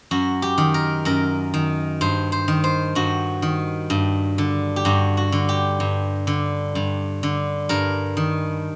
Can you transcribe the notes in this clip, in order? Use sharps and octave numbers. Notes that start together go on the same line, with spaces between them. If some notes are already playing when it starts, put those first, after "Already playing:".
F#2 F#4
G4
D#3
A#4
F#2 A#4
D#3
G2 C5
C5
D#3
C5
G2 F#4
D#3
G2
D3
G4
G2 F#4
F#4
D3
G4
G2
D3
G2
D3
G2 A#4
D#3